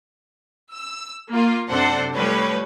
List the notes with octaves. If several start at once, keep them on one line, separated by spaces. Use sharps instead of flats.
E6
A#3 F4
F#2 C3 D4 A4 C5 F#5
F3 G3 A3 B4 C#5